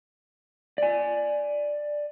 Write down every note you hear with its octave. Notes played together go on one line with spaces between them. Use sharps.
D5 G#5